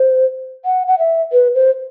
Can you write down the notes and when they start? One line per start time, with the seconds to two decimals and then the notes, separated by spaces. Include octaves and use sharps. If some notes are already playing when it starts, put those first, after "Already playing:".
Already playing: C5
0.65 F#5
0.87 F#5
0.99 E5
1.32 B4
1.55 C5